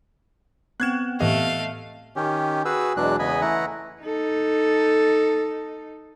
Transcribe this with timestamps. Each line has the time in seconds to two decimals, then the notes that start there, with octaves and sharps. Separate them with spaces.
0.80 B3 C4 F#6 G#6 E7
1.20 A2 E3 A3 G4 D#5 F5
2.16 D#3 C#4 G4
2.65 F#4 G#4 B4 E6
2.97 E2 B2 F#3 G#3 D4 F#6
3.19 E2 C#3 B3 D#5 G#5 B5
3.41 E3 A3 E4 F#5 A#5
4.01 D#4 A4